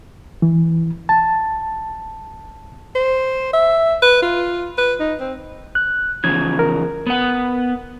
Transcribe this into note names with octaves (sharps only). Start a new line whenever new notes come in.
E3
A5
C5
E5
B4
F4
B4
D#4
C4
F#6
E2 C#3 F3 G#6
A#4
B3 F#5